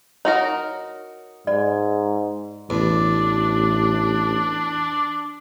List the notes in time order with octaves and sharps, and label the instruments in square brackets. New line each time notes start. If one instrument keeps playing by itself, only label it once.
[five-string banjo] D#4 F#4 A#4 [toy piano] C#5
[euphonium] G#2 [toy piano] D5
[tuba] A1 [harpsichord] E2 [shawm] D4